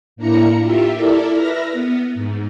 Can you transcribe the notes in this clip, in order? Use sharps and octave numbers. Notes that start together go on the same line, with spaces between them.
A2 A#3 D4 E4 A#5 C#7
F4 G4 E5
E4 A4 A#4 D5
B4 E5 F6 A#6
B3
G#2